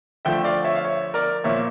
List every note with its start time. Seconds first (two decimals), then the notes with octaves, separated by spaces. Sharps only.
0.25 D3 F3 A3 E5 G5
0.44 D5 F5
0.64 C#5 E5
0.75 F5
0.85 C#5 E5
1.14 A#4 D5
1.44 A#2 F3 A#3 C#5 E5